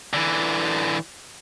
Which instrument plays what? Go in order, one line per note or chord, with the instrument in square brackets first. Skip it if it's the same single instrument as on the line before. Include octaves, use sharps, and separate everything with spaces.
[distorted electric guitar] D3 E3